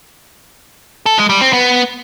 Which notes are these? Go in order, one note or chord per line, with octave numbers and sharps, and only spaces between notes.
A4
G#3
G3
C4
B3